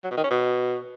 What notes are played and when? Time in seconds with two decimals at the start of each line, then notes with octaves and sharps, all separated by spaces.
0.04 F#3
0.10 B2
0.17 D#3
0.24 C#4
0.30 B2